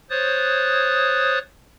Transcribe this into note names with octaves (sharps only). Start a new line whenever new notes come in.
C5 C#5 D#6 F#6 A6